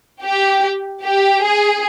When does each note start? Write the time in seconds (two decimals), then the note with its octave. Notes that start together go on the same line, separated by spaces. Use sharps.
0.23 G4
1.02 G4
1.41 G#4